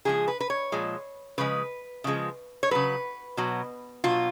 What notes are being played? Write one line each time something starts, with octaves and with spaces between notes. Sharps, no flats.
C#3 F3 G#3 G#4
B4
B4
C#5
A#2 F3 G#3
C#3 F3 G#3 B4
C#3 F3 G#3
C#5
C#3 F#3 B4
B2 F#3
B2 F#3 F4